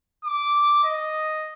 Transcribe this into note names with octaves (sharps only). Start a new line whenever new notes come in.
D6
D#5